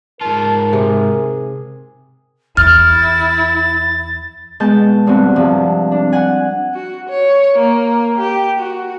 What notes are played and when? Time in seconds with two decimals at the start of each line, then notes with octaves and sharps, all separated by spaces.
0.21 G#2 F4 A#4 A5
0.73 C3 G#4
2.57 E2 E4 F6 A6
4.60 B2 G#3 A5 G6
5.06 E2 G2 C4 F#4
5.36 G2 C3 F3
5.92 D4
6.13 F#5 G#5
6.74 F#4
7.10 C#5
7.59 A#3
8.19 G4
8.60 F#4